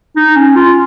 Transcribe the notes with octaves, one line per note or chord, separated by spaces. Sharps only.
D#4
C#4
F4